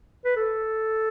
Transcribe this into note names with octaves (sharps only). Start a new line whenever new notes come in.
B4
A4